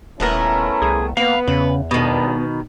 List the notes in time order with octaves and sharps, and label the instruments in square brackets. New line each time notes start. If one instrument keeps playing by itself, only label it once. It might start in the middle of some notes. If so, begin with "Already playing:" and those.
[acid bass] D#1 [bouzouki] A3 B3 A#4 [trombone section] C#4 E4
[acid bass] C2 [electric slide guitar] G#4
[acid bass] A#3 [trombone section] B3 [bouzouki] B4 [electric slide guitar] F5
[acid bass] E2 [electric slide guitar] C#3 [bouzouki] B4
[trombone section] G#1 G2 D4 [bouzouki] B2 D#3 [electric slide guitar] B3